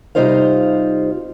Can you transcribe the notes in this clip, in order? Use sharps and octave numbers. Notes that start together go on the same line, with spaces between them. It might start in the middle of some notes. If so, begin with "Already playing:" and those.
C3 G3 D#4 F4 C5 F5